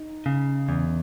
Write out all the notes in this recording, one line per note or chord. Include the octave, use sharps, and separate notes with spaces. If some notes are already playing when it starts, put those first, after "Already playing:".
Already playing: D#4
C#3
E2